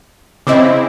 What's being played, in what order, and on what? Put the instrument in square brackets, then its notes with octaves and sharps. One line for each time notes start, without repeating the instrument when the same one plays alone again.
[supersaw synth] C#3 C4 E4 [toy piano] D#5 D6